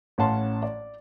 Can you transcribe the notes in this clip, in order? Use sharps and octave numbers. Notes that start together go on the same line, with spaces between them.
A1 C#4 F5 F#5 A5 C6
D5